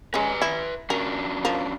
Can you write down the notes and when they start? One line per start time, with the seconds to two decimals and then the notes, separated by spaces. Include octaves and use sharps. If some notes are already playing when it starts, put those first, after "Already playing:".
0.14 G#3 C#4 B4 G#5 A#5
0.42 E4
0.90 C#4 D4 F#4 A#4
1.45 F3 A#4